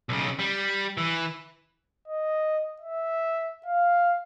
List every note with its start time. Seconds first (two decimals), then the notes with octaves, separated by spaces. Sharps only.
0.09 B1 C#3
0.39 G3
0.98 E3
2.08 D#5
2.82 E5
3.66 F5